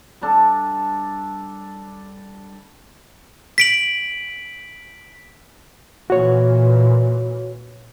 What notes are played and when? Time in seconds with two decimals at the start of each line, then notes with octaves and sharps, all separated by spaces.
0.22 G3 D4 A4
3.58 B6 D7 F#7
6.10 A#2 E3 F#4 C#5